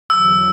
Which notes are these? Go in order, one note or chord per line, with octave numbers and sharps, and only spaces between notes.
E2 D3 F#3 E6